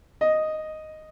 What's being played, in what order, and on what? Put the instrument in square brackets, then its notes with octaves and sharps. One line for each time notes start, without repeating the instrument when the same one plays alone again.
[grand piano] D#5